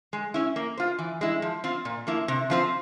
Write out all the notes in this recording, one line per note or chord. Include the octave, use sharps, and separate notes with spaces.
G#3
C#4 E4
A#3
F4 C5
E3
G#3 E4
F3
C4 F4
A#2
F3 A#3 E4
C3
F3 C4 F4 C5